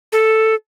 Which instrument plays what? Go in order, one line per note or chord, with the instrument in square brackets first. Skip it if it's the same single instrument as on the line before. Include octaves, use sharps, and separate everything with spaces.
[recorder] A4